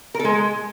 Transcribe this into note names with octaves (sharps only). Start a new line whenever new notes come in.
A#4
A4
G#3